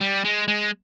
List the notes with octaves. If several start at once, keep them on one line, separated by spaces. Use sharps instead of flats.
G3
G#3
G#3